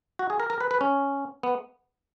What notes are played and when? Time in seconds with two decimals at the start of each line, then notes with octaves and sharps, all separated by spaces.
0.19 F#4
0.30 G#4
0.40 A#4
0.50 A#4
0.60 B4
0.71 B4
0.81 C#4
1.43 B3